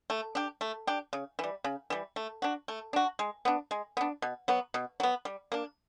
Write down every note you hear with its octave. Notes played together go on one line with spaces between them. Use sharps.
A3
D4 G4
A3
D4 G4
C#3
E3 G3
C#3
E3 G3
A3
D4 F#4
A3
D4 F#4
G#3
B3 D4
G#3
B3 D4
B2
F#3 B3
B2
F#3 B3
G3
A#3 D4